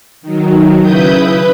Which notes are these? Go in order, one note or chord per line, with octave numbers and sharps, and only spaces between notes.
D#3 F#3
C#3 E4 B4 D#6 G6
B4